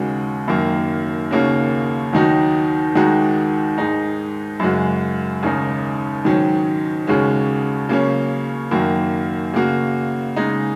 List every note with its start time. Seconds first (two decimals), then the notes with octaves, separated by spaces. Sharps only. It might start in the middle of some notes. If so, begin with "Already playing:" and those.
Already playing: D#2 C#3 G#3 F#4
0.48 F#2 D#3 F#3 A#3
1.31 D#2 C#3 A#3 C#4 F#4
2.13 D#2 D#3 F#3 D#4 F#4
2.95 D#2 D#3 G#3 D#4 F#4
3.78 G#2 G#3 D#4
4.59 F#2 C#3 G#3 F#4
5.43 D#2 C#3 G#3 D#4
6.24 G#2 D#3 F#3 C#4
7.07 D#2 C#3 G#3 C#4 F#4
7.89 C#3 F#3 A#3 C#4
8.71 F#2 D#3 A#3 F#4
9.54 C#3 A#3 F#4
10.36 C#3 G#3 D#4